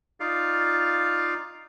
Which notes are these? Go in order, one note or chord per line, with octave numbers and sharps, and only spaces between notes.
D#4 F4 D5 F5